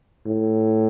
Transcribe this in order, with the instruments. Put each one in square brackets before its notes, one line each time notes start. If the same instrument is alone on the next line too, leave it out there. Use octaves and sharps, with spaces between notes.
[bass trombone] A2